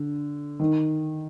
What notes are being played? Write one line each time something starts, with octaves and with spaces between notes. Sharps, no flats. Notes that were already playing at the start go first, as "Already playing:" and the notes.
Already playing: D3
D#3